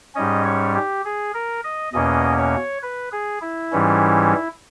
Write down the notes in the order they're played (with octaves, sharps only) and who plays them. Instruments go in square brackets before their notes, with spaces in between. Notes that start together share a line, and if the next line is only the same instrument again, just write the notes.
[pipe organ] G#2 G3 C#4 D#5
C#5
G4
G#4
A#4
D#5
E2 B2 A#3 C#4 D#5
C#5
B4
G#4
E4
G#2 E3 G3 C#4